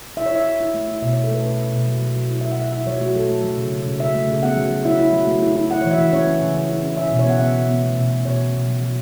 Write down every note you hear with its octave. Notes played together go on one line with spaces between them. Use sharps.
E4 E5
C#5
E4 E5
E4
E4
A3
E4
B2 E5
B2 C#5
A4
A3 B4
C#4 B4
C#4
B2
F#3
F#3
F#3
E4
E4 E5
F#5
F#3 E5
E4 E5
F#3 C#5
A3 F#4
F#3 A4
A3
F#3
C#3
C#3
C#3
C#3 E5
A3
C#3
B3 F#5
F#3
F#3
E4 E5
E4
F#3
A3
E4
E4
E4 F#5
E3 C#5
E5
E3
C#4 C#5
C#4
C#3
C#4
E4
C#4
E4 E5
B2 E5
C#5
B3 F#5
B3 E5
B3
B3
A3
B2
B2
B2 C#5
C#4
B2
F#3
F#3